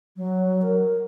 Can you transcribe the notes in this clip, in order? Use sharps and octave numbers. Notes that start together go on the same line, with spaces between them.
F#3
A#4